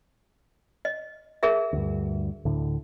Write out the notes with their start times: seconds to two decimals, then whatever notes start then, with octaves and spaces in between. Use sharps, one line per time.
0.85 D#5
1.43 G#4 A#4 E5
1.73 D2 G2
2.45 D2 A2 D3